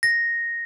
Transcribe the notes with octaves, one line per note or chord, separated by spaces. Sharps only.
A#6